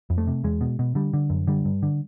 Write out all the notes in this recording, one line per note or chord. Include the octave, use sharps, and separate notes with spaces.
F2
A3
C3
E2 G#3
B2
B2
D3 G3
D3
F#2
D3 G3
G2
D3